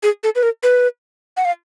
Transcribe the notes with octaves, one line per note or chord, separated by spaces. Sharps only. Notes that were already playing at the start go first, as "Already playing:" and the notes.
G#4
A4
B4
A#4
B4
F#5
F5